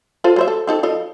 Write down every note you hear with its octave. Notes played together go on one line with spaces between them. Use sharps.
F4 A4 C5
F#3 C5 E5
A4
C4 D#4 A4
F3 A4 D#5